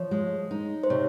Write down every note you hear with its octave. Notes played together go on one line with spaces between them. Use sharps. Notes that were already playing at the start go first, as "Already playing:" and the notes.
Already playing: F3 C#5
G#3
D#4
C5
C3 C#5